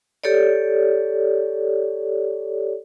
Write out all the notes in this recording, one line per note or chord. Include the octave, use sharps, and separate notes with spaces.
G4 A4 C#5 D5